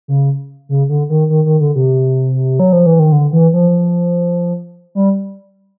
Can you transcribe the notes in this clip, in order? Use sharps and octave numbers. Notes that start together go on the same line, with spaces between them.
C#3
C#3
D3
D#3
D#3
D#3
D3
C3
F#3
F3
E3
D#3
D3
E3
F3
G3